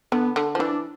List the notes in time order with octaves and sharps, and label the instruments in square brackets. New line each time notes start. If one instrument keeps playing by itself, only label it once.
[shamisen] D3 [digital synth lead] B3
[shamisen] D3
F3
[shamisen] E3 [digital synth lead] D4